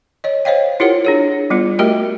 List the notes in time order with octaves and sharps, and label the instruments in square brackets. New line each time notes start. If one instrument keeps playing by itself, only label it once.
[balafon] C#5 D#5
C5 C#5 D#5 F5 G5
E4 F4 G4 A#4 C#5 F#5
D4 G#4 C#5
G3 B3 F4
A3 F#4 G4 A#4 D#5 G5